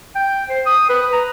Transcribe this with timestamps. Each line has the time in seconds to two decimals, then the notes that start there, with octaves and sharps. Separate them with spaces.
0.15 G5
0.50 C5
0.66 D#6
0.89 B4
1.13 A#5